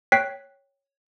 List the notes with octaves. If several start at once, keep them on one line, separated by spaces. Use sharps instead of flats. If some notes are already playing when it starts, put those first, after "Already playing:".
C#5 G5 F#6 B6 C7